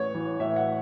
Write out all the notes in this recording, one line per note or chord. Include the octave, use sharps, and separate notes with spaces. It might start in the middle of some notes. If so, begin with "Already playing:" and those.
Already playing: A1 C#5
E3
A2 E5
F#5